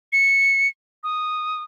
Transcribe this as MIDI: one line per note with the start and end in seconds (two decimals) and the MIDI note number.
0.13 0.68 97
1.04 1.63 87